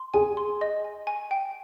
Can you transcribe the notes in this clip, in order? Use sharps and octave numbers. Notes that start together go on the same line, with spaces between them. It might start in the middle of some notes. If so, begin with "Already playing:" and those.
Already playing: C6
G#4 G#5
C6
D#5
G#5
G#5
G5